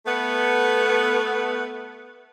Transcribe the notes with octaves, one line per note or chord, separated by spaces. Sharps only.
A3 B3